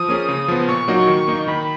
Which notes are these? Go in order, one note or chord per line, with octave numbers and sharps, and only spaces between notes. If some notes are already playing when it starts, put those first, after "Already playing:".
Already playing: F3 D#6
A#3 C#4 G#4
C#3
F3 B3
A#2 C#6
F#3 A#3 D#4 F#4
D#3
A#3 D#4
D#3 B5